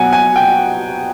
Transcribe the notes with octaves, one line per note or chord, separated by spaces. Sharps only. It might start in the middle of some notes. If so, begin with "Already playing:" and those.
Already playing: B2 F#3 F#5 G#5
G#5
G5